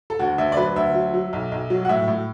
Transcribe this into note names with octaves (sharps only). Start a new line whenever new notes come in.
A4
D2 F#4
D2 E5
D5
F#3 B4
D2 E5
F#3
F#3
B1
B1
F#3
F#5
A2 E5
A2